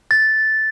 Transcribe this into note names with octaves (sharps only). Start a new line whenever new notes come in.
A6